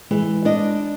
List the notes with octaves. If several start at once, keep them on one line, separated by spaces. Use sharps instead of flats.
E3 G#3
D4 D5 D#5